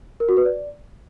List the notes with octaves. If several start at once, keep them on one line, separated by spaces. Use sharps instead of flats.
A#4
F#4
B4
D5